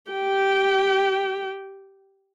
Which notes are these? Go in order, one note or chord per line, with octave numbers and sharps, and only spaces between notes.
G4 G5